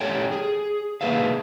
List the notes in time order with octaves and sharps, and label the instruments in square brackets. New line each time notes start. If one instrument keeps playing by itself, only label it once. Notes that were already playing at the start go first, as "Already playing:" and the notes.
[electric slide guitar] G4 A4 C#5 G5
G#4
A#3 G#4 B4 E5 F5